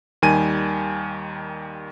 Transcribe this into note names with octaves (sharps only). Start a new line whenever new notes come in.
D#2 D#3 G3 G#5 D#7